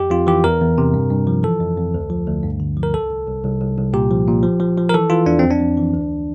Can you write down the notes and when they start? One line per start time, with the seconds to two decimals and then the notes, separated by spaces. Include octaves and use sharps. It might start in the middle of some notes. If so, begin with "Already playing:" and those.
Already playing: F2 G4
0.10 F2 F4
0.27 E3 G4
0.44 E2 A#4
0.61 E2
0.78 C3
0.94 G2
1.10 G2
1.27 F3
1.43 E3 A4
1.60 F2
1.77 F2
1.94 D2
2.10 F3
2.27 D2
2.43 G2
2.60 D3
2.77 F3
2.83 A#4
2.94 C2 A4
3.10 C2
3.27 C2
3.44 C2
3.61 C2
3.77 C2
3.93 A#2 G4
4.11 F3
4.27 A#2
4.43 F3
4.60 F3
4.78 F3
4.89 A#4
4.94 E3 A4
5.10 E3 F4
5.26 E2 D4
5.39 F2 C4
5.51 D4
5.60 F2
5.78 E3
5.94 D2